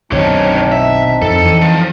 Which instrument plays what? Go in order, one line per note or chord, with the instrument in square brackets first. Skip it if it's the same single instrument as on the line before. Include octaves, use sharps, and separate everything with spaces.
[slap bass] B1 B2 D#3 [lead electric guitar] D3 C#5 [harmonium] C4 D4 D#4
[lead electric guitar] E5
[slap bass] F2 [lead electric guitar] A4
[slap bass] E3
[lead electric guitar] F3